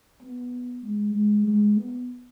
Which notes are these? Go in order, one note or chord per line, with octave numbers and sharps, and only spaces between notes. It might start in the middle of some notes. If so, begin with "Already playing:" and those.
B3
G#3
G#3
G#3
B3